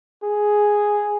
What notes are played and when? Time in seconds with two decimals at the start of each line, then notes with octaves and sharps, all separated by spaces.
0.23 G#4